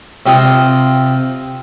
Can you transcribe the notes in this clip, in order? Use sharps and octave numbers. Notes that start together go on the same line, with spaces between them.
C3 C4 F4 D#5